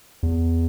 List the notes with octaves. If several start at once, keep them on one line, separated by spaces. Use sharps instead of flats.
E2